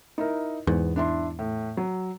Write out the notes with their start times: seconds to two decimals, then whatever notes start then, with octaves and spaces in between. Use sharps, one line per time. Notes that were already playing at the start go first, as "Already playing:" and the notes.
0.18 D#4 E4 A#4
0.67 E2 G#2 B3
0.96 D4 E4 C6
1.39 A2
1.77 F#3